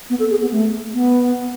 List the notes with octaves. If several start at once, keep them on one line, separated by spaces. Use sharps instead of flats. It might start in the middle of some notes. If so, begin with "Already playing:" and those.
B3
A4
G#4
B3
A3
B3